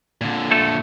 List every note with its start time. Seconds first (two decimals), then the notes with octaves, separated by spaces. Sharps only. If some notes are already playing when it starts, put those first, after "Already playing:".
0.21 A#2 D3
0.51 A3 A4